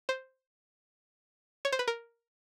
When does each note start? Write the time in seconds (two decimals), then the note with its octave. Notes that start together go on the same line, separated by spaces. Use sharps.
0.09 C5
1.65 C#5
1.72 C5
1.79 B4
1.88 A#4